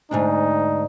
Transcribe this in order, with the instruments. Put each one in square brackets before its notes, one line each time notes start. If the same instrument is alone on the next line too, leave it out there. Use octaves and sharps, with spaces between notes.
[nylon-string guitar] D2 G#2 D4 [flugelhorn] D#4